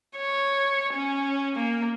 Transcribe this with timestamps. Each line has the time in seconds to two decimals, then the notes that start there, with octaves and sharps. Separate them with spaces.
0.17 C#5
0.94 C#4
1.56 A#3